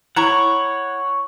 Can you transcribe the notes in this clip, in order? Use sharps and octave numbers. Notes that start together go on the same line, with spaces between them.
E4 C#5 F#5 A#5